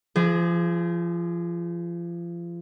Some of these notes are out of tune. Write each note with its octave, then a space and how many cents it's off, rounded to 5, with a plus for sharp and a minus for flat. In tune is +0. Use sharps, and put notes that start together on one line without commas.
F3 -30 G#4 +10